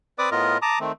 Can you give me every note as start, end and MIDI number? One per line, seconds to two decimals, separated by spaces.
0.19 0.30 60
0.19 0.30 71
0.19 0.30 74
0.19 0.30 86
0.19 0.30 87
0.31 0.58 45
0.31 0.58 59
0.31 0.58 65
0.31 0.58 70
0.31 0.58 75
0.62 0.79 81
0.62 0.79 82
0.62 0.79 86
0.62 0.79 87
0.80 0.92 51
0.80 0.92 57
0.80 0.92 60